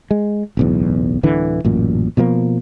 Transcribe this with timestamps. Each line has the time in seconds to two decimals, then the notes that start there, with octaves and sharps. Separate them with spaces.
0.11 G#3
0.57 D1 B1 E2
1.23 D1 D3 E3
1.65 A1 F#2 A#2
2.17 B2 F3 A3 A#3